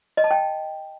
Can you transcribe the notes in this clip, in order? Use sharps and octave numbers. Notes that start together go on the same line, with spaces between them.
D#5
A5
G5